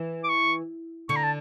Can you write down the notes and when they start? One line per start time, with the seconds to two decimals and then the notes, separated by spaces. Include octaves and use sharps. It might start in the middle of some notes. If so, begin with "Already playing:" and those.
Already playing: E3
0.24 D6
0.29 C#6
1.09 D3 C#6
1.16 A#5
1.24 A5